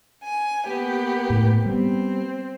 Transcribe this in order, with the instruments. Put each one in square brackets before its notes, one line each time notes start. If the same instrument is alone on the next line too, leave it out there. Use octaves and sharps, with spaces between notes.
[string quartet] G#5
A#3 B3 G4
[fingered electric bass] A2
[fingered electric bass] G3 B3 [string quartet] C4